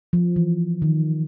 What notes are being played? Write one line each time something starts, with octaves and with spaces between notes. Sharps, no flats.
F3
E3
D#3